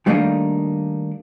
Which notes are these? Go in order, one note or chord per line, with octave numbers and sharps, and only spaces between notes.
D#3 G3 A3 A#3 D4 D#4